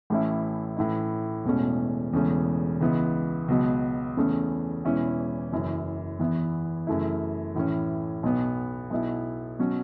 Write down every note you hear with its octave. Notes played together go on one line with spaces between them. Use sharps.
A1 A2 A3 C#4 E4
A2 E3 C#4 E4
E1 E2 B2 A3 C#4
E1 E2 C#3 A3 C#4
C#2 C#3 E3 B3
C#2 B2 F#3 B3
E2 C#3 A3 C#4
E1 E2 E3 C#4 E4
F#1 F#2 E3
E2 E3 B3 E4
F#2 C#3 E3 A3 E4
A1 A2 E3 C#4
B1 B2 B3
B1 B2 B3 E4
B2 F#3 C#4